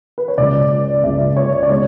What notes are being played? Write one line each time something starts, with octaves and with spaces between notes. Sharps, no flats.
B4
C#5
C#2 C#3 G#3 D5
C#2 C#3 G#3 E5
C#5
D5
B2 G#3 C#5